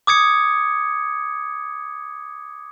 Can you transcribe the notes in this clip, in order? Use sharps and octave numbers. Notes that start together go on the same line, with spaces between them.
D6 D#6 G#6 C#7